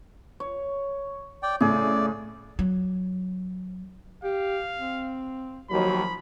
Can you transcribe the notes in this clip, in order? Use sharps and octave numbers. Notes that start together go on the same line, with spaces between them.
C#5
D5 G5
A2 C#3 G#4 D5
F#3
G4 F5
C4
D#2 F3 F#3 B5